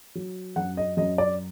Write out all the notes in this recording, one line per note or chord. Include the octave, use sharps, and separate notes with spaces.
F#3
F#2 F#5
D#5
F#2 D#5
D5